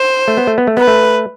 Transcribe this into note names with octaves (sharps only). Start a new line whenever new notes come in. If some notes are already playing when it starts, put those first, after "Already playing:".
Already playing: C5
A3
B3
A3
B3
A3
B3 B4
A3